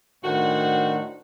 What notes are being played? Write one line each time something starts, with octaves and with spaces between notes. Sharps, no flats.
A2 D#3 D4 F#4 C5 F#5